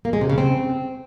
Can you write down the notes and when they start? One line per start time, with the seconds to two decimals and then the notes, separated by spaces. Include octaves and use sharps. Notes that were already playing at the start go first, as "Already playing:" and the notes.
0.05 A#3
0.13 G#3
0.21 C3
0.30 C#3
0.38 C4